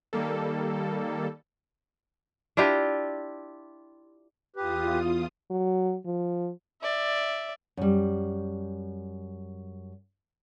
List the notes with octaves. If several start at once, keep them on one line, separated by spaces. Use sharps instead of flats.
D#3 G3 A#3 A4
D4 E4 F4 G4
E2 F4 G4 B4 D#6
F#3
F3
D5 E5
F#2 G3